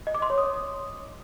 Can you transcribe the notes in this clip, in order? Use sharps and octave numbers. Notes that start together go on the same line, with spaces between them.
D#5
D6
C6
C#5
D#6